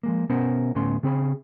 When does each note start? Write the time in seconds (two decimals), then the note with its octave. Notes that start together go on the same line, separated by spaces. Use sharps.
0.03 F3 G#3 A#3
0.29 B2 B3 C#4 A#4 C5 F#5
0.75 D2 A2 B3 C#4 C6
1.03 C#3 C4 G#4 B5